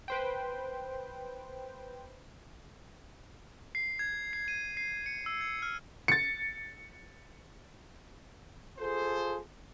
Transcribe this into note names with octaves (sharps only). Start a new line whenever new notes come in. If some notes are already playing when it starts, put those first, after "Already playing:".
B4 C5 G5
C7
G#6
C7
D#7
C7
C#7
E6
G#6
F6
A6 C#7
F4 G#4 A4 C5